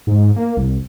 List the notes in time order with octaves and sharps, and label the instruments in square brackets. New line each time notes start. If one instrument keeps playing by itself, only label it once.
[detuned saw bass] G#2
A#3
C2